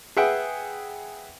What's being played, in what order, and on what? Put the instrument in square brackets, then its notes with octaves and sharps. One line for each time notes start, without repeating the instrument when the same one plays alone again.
[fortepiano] G#4 B4 E5 F#5 G5